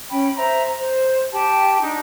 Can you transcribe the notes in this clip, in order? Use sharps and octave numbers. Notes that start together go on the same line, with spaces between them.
C#4 G5 B5
C5 E5 A#5
C5
G4 G5 A5
D4 D#4